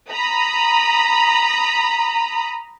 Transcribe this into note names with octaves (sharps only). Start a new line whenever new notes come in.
A#5 B5 D#6